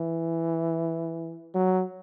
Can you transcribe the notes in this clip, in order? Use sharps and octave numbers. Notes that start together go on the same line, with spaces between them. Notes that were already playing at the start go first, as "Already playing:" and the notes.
Already playing: E3
F#3